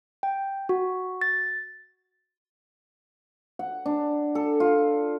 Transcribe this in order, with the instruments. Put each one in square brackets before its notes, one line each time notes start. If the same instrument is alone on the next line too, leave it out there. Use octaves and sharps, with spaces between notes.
[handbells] G5
F#4
A6
[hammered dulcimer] F#5
D4
A4
F4